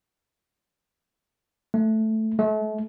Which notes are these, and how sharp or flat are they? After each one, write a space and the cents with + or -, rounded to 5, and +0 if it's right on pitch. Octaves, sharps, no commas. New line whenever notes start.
A3 -5
A3 -40